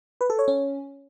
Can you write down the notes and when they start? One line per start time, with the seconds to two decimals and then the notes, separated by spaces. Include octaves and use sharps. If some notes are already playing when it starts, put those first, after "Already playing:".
0.21 B4
0.30 A4
0.39 C#5
0.48 C#4